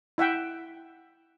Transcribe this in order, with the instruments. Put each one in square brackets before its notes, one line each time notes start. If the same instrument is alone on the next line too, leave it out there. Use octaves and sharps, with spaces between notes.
[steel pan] E4 E5 F#5 G5